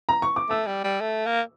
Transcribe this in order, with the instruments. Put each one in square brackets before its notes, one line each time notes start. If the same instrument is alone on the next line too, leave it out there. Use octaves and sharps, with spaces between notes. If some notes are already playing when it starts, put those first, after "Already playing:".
[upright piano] A#5
C#6
D6
[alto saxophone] A3 [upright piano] E6
[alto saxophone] G3
G3
A3
A#3